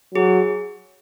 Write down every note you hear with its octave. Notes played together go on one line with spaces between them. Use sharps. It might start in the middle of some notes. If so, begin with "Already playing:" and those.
F#3 G#4